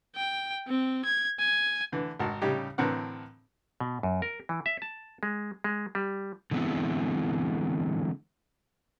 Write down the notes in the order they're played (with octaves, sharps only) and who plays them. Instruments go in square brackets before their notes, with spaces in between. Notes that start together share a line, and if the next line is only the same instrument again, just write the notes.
[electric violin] G5
C4
G#6
G#5
[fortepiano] D3 E3
G#1 F#4 A#4 A5
A2 C#3 G3 C#4 D#4 G4
A2 D3 E3 C4 A#4 F#5
[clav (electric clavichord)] B2
F#2
A#4
E3
E5
A5
G#3
G#3
G3
[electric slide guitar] D3 E3 G#3 B3 C4 E4